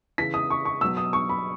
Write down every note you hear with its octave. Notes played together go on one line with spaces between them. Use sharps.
C#3 E3 B6
D#6
C#6
C#6
B2 F#3 E6
D#6
C#6
B5